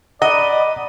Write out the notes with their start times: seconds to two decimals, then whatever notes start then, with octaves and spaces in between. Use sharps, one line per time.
0.22 D5 D#5 F#5 A#5 B5 A#6